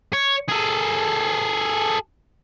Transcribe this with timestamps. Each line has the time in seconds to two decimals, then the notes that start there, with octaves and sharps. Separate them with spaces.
0.13 C#5
0.49 G#4 A4